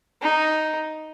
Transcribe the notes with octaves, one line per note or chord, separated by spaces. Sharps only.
D#4